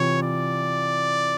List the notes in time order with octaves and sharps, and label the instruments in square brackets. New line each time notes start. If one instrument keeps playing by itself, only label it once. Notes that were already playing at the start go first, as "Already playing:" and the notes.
Already playing: [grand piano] C3 E3 C4 F4 [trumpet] C#5
[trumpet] D5